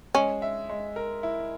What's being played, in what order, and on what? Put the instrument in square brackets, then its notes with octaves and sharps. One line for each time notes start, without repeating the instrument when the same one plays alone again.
[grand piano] G#3 [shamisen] C#4
[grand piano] E5
G#3
A#4
E4